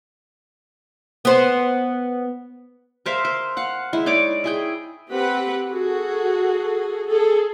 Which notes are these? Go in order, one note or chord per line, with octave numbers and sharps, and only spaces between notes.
B3 C5
A#4 C5 E5 F5
C5
F5 F#5
G#3 E4
D#4 C#5 D5 D6
E4 G#4 G5
C4 G4 B4 F#5 B5
F#4 G#4 A4
G#4 A4